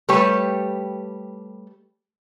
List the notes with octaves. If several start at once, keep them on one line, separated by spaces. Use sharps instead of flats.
G3 A3 G4 B4 C#5